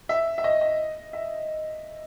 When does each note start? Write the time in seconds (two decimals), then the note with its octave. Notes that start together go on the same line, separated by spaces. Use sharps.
0.09 E5
0.38 E5
0.44 D#5
0.61 D#5
1.13 E5